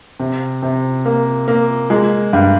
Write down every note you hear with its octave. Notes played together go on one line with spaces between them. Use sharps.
C3
C3
A#3
A#3
G#3
G2